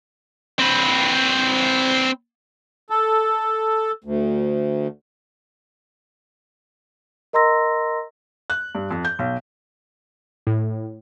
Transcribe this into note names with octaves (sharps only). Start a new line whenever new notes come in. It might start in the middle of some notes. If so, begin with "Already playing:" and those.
C4 B4
A4
D2
A#4 D#5 A#5 C6 E6 A#6
F#6
G2
F2
G6
B1
A2